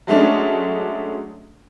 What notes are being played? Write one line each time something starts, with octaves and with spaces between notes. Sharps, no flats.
F#3 G#3 A3 C#4 D4